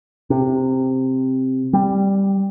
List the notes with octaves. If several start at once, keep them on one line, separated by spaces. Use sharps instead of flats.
C3
G3